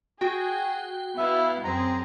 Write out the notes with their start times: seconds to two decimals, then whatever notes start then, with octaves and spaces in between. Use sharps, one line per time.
0.21 F#4 G#4 G5
1.18 B3 E4 E5 F5
1.64 F#2 C4 G#4 A#5